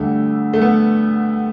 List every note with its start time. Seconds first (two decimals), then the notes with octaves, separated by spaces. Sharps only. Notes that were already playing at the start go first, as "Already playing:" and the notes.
Already playing: D2 D3 G3 A3
0.54 A3
0.61 B3